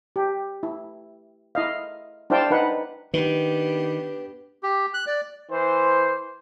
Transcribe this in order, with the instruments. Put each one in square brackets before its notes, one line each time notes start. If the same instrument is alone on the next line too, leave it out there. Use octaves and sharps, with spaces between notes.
[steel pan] G4
E4
E4 D#5 F5
D4 E4 C5 F5 G5 A5
D#4 B4 F#5
[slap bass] D#3 [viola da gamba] B3 D4 G4 [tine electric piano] B4
[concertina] G4
F#6
D5
[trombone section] E3 C5